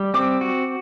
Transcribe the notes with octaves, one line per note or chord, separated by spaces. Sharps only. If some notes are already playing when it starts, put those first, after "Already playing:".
Already playing: G3
C4 D6
F#4